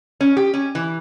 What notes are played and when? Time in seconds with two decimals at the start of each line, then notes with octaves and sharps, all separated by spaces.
0.21 C#4
0.37 G4
0.54 C#4
0.75 E3